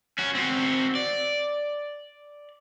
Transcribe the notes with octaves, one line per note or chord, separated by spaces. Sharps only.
C#4 F#4
C4 F#4
D5